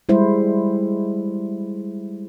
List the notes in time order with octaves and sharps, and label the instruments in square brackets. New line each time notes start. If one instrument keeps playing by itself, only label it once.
[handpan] G3 G#3 E4 C5